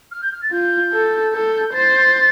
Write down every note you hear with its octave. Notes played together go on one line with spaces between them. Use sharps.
F6
G6
F6
A6
F4 G6
A4
A4 G6
C5 A6